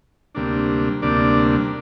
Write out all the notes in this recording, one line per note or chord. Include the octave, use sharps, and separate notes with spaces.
D2 C3 G3 A#3 D4
D2 C3 G3 A#3 D4 D5